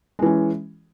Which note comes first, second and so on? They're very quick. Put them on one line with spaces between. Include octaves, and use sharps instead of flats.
G#3 E3 C#4